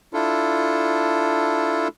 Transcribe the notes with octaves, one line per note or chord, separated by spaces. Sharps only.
D4 E4 F4 A4